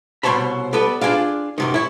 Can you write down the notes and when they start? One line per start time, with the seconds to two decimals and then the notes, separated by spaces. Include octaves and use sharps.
0.23 C2 B2 C5 C#5 A5 B5
0.73 G3 B3 A4 B4
1.01 D4 F4 F#4 G#4 D5 F5
1.58 F#2 C3 D#3
1.74 E4 C#5